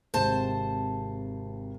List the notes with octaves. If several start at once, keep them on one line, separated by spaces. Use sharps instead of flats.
G#1 C3 C5 A5